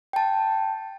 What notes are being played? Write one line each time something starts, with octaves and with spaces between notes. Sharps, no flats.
G5 A5